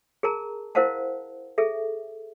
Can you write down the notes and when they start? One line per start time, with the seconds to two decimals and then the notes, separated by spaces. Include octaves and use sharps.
0.23 G#4 A#4 A5 A#5
0.75 E4 A#4 C5 F5 F#5 A5
1.58 G#4 A4 E5